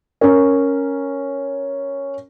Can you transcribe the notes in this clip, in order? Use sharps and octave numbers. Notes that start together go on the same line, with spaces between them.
C#4 A#4